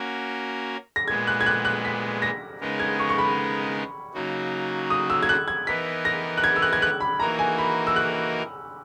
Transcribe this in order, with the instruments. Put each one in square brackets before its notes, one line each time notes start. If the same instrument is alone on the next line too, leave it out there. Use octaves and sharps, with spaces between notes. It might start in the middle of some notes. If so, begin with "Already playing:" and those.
Already playing: [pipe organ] A#3 C#4 F#4 A#4
[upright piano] A#6
[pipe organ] A#2 G#3 B3 [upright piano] G#6
[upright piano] F#6
G#6
F#6
F#6
B6
A#6
[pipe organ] C#3 G#3 B3 D#4 A#4
[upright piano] G#6
C#6
C#6
B5
[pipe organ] C#3 F#3 A#3 D#4 F#4
[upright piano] D#6
E6
G#6
F#6
G#6
[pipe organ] E3 B3 D#4 A#4 [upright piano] B6
[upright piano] A#6
F#6
G#6
E6
F#6
G#6
F#6
B5
[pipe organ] E3 A#3 D#4 F#4 A#4 [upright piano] A#5
[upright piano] G#5
B5
E6
F#6